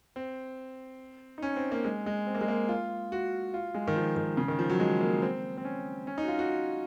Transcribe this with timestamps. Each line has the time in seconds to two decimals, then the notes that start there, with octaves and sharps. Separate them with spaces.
0.16 C4
1.38 D#4
1.42 C#4
1.56 C4
1.72 A#3
1.85 G#3
2.06 G#3
2.27 C4
2.34 A#3
2.41 G#3
2.48 A#3
2.69 F4
3.12 F#4
3.54 F4
3.75 G#3
3.88 D#3
3.96 F3
4.16 D#3
4.37 C#3
4.48 D#3
4.59 F3
4.69 F#3
4.80 G#3
5.01 A#3
5.22 C4
5.58 C4
5.65 C#4
6.07 C#4
6.18 D#4
6.23 F#4
6.28 F4
6.39 F#4